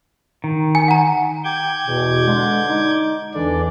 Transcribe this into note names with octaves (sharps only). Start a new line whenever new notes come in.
D#3
G#5
F#5 A#5
G5 D6 G6 G#6
E2 B2
D3 G#3
D#4
E2 D3 E3 D4 D5